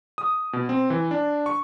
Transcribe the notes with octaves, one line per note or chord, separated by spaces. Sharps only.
D#6
B2
C4
E3
D4
C#6